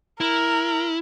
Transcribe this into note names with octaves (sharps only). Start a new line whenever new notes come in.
E4 A#4